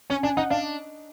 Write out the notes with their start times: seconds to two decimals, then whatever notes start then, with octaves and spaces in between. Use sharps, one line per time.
0.10 C#4 G#5
0.23 D4 G#5
0.37 D#4 F#5
0.50 D4 F5